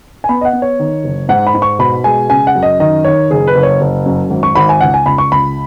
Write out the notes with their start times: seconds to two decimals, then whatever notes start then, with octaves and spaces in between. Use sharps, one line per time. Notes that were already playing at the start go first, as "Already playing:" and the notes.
0.24 G#5
0.29 B3 B5
0.41 D#5
0.45 F#5
0.53 B3
0.62 C#5
0.79 D#3
1.04 F#1
1.29 G#2 F#5
1.47 B5
1.54 G#2
1.62 C#6
1.79 B2 B5
2.04 G#3 G#5
2.30 C#3 G#5
2.47 F#5
2.55 F#2
2.63 D#5
2.80 D#3 D#5
3.05 D#3 C#5
3.31 F#1 G#4
3.47 B4
3.55 F#1
3.63 C#5
3.81 F#1
4.06 F#2
4.30 G#1
4.43 C#6
4.55 G#1 B5
4.69 G#5
4.81 C#2 F#5
4.94 G#5
5.06 C#2 B5
5.18 C#6
5.32 C#2 B5